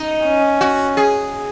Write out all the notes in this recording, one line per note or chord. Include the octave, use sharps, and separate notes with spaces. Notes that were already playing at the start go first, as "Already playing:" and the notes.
Already playing: D#4
C#4
F#4
G#4